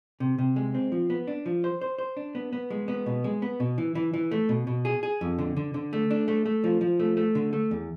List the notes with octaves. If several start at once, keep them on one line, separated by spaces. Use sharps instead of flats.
C3
C3
G#3
C4
F3
B3
D4
F3
C5
C5
C5
D4
B3
B3
G#3
B3
B2
G#3
B3
B2
E3
E3
E3
A3
B2
B2
G#4
G#4
F2
D3
D3
D3
A3
D4
A3
A3
F3
F3
A3
A3
D3
A3
E2